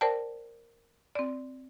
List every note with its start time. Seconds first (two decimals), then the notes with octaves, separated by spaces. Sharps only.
0.01 A#4 C5 D5 G5 A5
1.15 C4 D5